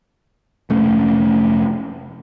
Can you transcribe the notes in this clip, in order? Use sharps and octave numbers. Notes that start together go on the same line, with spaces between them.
F1 A3 C#4